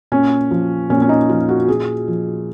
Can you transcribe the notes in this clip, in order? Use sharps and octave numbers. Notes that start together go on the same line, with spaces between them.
A#2 C#4
F3
A#2 C#4
C#4
D#4
F3 F4
F#4
A#2 G#4
F3